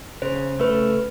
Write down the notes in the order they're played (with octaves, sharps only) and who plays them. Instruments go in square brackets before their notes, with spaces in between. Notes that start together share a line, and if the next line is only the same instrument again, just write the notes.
[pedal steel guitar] C#3 [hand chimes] C5
[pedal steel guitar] A3 [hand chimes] B4